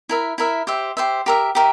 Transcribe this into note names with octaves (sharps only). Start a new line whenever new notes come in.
E4 A#4 E5
E4 A#4 E5
G4 C5 E5
G4 C5 E5
G4 A#4 E5
G4 A#4 E5